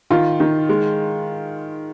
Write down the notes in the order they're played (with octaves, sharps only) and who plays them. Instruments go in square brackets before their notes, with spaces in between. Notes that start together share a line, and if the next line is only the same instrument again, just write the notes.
[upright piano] D#3 F4
D#3
G#3